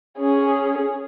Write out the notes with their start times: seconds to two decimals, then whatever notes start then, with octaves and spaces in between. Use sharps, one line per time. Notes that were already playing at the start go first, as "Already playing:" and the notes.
0.18 C#4 G#4